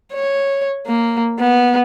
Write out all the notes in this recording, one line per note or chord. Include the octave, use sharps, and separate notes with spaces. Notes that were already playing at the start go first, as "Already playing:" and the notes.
C#5
A#3
B3